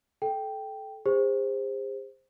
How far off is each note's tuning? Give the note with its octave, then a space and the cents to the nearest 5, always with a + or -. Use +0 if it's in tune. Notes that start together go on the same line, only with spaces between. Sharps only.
A4 -25 G5 +0
G#4 -45 C5 +5